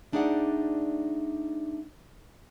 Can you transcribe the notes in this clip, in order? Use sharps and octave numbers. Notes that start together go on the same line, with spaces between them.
A3 D4 D#4 G#4 D5 F#5